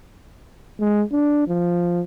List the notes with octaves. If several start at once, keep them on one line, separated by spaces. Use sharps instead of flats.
G#3
D4
F3